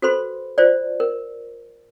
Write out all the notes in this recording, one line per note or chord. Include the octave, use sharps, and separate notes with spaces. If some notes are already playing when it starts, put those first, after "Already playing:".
F#4 A4 B4 C5 B5 C6
F4 C5 D5
A#4